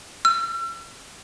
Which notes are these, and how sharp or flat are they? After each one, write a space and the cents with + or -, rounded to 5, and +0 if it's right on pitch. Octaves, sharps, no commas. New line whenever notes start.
E6 +45